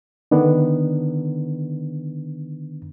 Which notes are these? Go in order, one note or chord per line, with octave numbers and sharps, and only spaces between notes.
D3 D#3 B3 D4